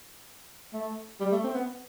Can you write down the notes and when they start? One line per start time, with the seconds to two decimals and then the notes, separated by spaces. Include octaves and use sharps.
0.73 A3
1.20 G3
1.32 A3
1.44 C4
1.54 B3